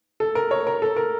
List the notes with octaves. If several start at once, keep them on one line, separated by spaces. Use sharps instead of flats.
A4
A#4
C#5
A#4
A4
A#4